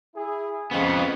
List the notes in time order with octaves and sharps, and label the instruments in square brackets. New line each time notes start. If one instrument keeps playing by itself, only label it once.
[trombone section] E4 G#4
[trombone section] F2 [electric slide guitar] F3 B3 [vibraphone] C#4 G#4 D#5